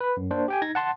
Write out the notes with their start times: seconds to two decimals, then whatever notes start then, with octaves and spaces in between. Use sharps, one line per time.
0.01 B4 B5
0.17 F#2
0.31 A#3 D4 C5
0.48 G4 G5 G#5
0.62 D#4 G#6 A#6
0.75 F#5 A5 C6